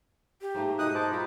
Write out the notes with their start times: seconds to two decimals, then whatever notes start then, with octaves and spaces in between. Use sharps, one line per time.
0.41 G4
0.54 G#2 A3 A#3
0.79 B2 G#3 D#4 D#6 F#6
0.95 C5 A5 D6
1.11 G3 F4 A#4 B5